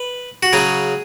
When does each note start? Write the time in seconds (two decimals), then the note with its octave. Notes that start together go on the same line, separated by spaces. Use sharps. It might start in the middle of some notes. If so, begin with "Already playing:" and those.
Already playing: B4
0.43 F#4
0.53 C#3 F#3 G#4